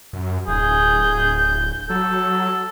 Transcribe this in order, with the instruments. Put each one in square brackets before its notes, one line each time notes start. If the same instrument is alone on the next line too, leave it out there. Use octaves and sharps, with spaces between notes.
[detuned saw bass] F#2
[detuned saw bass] D1 [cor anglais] G#4 [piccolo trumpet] G6
[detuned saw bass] F#3 [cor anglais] A4